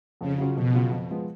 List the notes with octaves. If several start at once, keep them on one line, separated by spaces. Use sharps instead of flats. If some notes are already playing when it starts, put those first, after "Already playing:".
F2 C#3
C#3 F#3 C#4 F4
F2 B2
C#3 F#3 C#4 F4
F2
F3 G#3 B3